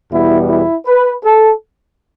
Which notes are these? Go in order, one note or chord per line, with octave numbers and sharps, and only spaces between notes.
E2 B2 G3 B3 E4
E4
B4
A4